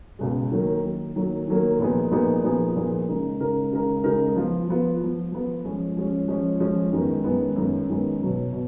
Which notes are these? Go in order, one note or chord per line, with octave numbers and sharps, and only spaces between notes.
C#2 B2 G#3
D#3 F#3 A#3
D#3 F#3 A#3
D#3 F#3 A#3
D#3 F#3 A#3
A#2 F3 B3 D#4 G#4
A#2 F3 B3 D#4 G#4
A#2 F3 B3 D#4 G#4
A#2 F3 B3 D#4 G#4
C#3 G#3 D#4 A#4
C#3 G#3 D#4 A#4
C#3 G#3 D#4 A#4
C#3 G#3 D#4 A#4
F3 B3 F4
F3 B3 F4
F3 B3 F4
F3 B3 F4
F3 G#3 C#4
F3 G#3 C#4
F3 G#3 C#4
F3 G#3 C#4
F#2 D#3 G#3 B3
F#2 D#3 G#3 B3
F#2 D#3 G#3 B3
F#2 D#3 G#3 B3
B2 F#3 B3
B2